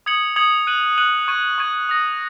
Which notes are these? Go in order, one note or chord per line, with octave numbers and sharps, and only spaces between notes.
D#6 G#6 C#7 F#7
D#6 G#6 C#7 F#7
F#6 D#7 F#7
F#6 D#7 F#7
C#6 G#6 D#7
C#6 G#6 D#7
D#6 A#6 F#7